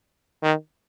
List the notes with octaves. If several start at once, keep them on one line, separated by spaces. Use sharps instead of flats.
D#3